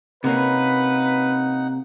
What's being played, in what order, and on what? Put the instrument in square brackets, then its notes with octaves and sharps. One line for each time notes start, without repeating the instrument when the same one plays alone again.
[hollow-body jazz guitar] C3 A#3 C#4 [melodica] D#4 F#5 [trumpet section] B4